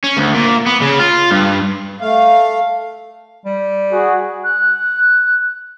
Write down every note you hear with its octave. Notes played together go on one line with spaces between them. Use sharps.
C#4
D2
A#2
B3
C#3
F4
G2
A3 F5
G3
F#4 G#4
F#6